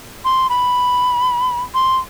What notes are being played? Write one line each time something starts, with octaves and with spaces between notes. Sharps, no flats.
C6
B5
C6